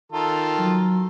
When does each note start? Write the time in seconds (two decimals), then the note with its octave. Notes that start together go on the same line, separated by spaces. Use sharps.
0.12 D#3 F4 A4
0.59 F#3